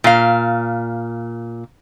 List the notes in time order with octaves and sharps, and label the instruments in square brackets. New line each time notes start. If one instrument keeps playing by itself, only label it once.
[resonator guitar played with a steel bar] A#2 F5